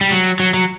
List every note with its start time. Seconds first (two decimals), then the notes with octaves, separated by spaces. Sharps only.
0.01 G3
0.11 F#3
0.40 F#3
0.54 F#3